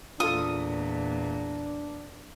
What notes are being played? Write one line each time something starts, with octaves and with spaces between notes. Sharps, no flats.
E2 A#2 D4 F4 A4 D#6